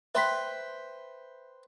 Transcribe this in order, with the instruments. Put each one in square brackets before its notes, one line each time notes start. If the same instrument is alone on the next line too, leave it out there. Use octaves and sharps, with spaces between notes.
[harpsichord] B4 C5 G5 [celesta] E5 C6 B6